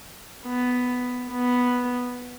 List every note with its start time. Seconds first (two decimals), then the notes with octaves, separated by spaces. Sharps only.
0.47 B3
1.31 B3